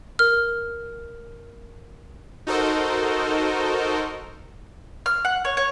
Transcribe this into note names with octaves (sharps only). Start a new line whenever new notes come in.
A#4 F6
D#4 F#4 A4 A#4 C5 D#5
F6
F#5
C#5
C#5